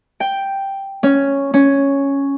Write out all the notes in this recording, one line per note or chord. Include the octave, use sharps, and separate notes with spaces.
G5
C#4
C#4